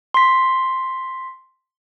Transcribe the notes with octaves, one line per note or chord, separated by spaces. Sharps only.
C6 B6